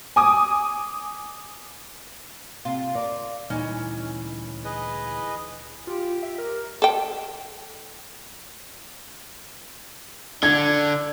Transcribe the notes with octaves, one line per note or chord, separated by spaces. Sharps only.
G#5 D6 D#6
C3 F4
A#4 D5
D2 A#2 E3 G3 C#4 D#4
G#4 B4 D#5
F4 G4
E5
A#4
A4 G5
D3 D4 G#6